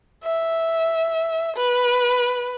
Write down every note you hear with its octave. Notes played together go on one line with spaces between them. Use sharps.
E5
B4